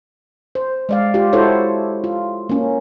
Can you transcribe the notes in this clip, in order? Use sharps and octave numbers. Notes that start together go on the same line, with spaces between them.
C5
G#3 D5 F5
F4 G4
E4 F#4 A4 C5 C#5
F4
A#3 C#4